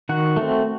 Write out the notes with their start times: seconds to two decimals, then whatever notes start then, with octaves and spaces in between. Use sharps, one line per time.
0.09 D#3 F#4 F#5
0.36 A3 C4